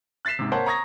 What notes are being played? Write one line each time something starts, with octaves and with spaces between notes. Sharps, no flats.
F#6 A6 B6 C7 E7
G#2 C3
A#3 C5 C#5 F#5 A5
A#5 C#6 D#6 G#6 A#6